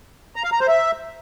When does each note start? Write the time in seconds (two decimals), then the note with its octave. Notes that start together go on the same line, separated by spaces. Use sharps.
0.36 A#5
0.44 F5
0.52 A#5
0.60 C5
0.68 E5